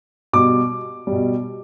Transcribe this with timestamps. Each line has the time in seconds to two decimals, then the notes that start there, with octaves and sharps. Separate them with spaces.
0.33 B2 G3 D6
1.07 G3
1.12 B2